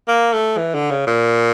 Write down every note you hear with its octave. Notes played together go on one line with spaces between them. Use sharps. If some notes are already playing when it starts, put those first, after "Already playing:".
A#3
A3
E3
D3
C#3
A#2